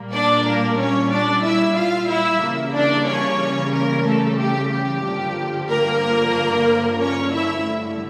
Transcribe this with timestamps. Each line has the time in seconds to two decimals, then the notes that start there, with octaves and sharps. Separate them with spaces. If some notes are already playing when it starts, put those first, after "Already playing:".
Already playing: A#2 G3 A#3
0.13 D4 D5
0.46 A#3 A#4
0.78 C#4 C#5
1.12 D4 D5
1.44 E4 E5
1.77 F4 F5
2.09 E4 E5
2.43 C#3 E3 G3 A#3
2.75 D4 D5
3.07 C#4 C#5
3.73 A#3 A#4
4.06 A3 A4
4.39 G4
4.72 G4
5.04 G2 D3 F3 A#3
5.69 A#3 A#4
7.00 C#4 C#5
7.33 E4 E5
7.66 G2 D3 A3